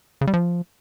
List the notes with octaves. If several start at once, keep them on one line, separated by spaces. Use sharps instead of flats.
C#3
G3
F3